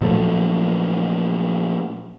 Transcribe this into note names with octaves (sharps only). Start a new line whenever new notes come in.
A#2 F3 F#3 A3